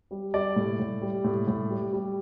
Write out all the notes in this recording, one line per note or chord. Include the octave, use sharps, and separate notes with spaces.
G3
G3 D5
A2
A2
G3
A2
A2
G3
G3